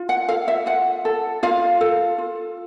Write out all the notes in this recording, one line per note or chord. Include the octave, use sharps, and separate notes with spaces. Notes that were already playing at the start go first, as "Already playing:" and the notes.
Already playing: F4
F#5
A4 F5
E5
F4 F#5
A4
F4 F5
A4
F4